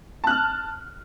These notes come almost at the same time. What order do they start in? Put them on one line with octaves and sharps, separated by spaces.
A5 F#6 F6